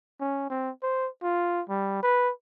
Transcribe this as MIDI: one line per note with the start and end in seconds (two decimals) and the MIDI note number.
0.21 0.48 61
0.50 0.70 60
0.83 1.08 72
1.23 1.62 65
1.69 2.00 55
2.02 2.31 71